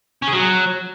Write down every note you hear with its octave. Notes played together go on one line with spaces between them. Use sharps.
C#4
G#4
F#3